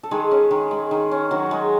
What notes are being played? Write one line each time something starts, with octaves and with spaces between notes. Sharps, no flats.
A4
D#3 G#3 G#4
C#4
D#3
G#3
D#3
C#4
D#3 F#3 F#4
G#3